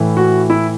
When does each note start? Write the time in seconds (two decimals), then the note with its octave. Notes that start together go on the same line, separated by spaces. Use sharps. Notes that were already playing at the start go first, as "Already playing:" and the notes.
Already playing: A2 E3
0.17 F#4
0.50 E4